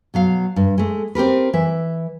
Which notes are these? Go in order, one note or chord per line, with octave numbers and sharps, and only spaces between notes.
B2 F#3 F5
G2
G#3 A3
C4 G4 A#4 B4
E3 E5